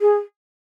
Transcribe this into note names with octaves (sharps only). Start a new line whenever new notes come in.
G#4